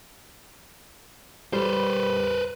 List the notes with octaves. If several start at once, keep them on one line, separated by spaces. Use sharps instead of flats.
G3 B4 C5